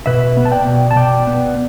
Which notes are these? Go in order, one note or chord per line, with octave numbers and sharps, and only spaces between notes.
B2 B4 E5
B3
A5
D5 G5
B2
A5
B2 D5 G5
B3